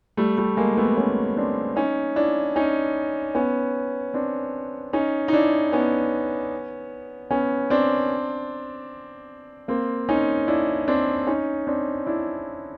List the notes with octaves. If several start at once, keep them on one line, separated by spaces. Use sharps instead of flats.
G3 A3
G3 A3
G#3 A#3
A3 B3
B3 C#4
C4 D4
C#4 D#4
D4 E4
C#4 D#4
B3 C#4
C4 D4
C#4 D#4
D#4
D4 E4
B3 C#4
B3 C#4
C4 D4
A#3 C4
C#4 D#4
D4 E4
C4 D4
C#4 D#4
C4 D4
D4 E4